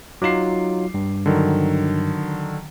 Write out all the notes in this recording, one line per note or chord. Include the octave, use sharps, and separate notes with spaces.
F#3 D#4 F4 D6 C7
G2
D3 D#3 F#3